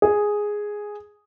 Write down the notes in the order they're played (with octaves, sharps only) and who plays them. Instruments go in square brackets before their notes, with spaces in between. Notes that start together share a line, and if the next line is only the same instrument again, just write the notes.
[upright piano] G#4